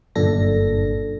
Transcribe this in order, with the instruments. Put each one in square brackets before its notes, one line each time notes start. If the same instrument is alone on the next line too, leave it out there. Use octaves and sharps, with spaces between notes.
[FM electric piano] G1 F#2 A#2 D4 A4 A#6